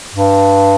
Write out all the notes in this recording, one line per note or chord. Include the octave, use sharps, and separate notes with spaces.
G2